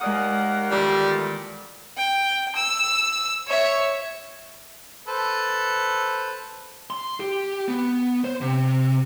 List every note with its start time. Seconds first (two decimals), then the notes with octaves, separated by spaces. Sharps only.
0.01 D#2 G#3 A#3 D5 F#5 D#6
0.71 E2 A#2 D#3 G3 A3
1.97 G5
2.56 E6
3.47 C#5 E5
5.07 A4 B4 C5
6.90 C6
7.20 G4
7.68 B3
8.24 C5
8.41 C3